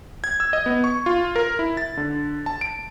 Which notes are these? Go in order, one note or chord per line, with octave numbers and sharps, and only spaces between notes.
G#6
E6
D#5
B3
C#6
F4
A#4
E4
A6
D3
A5
D7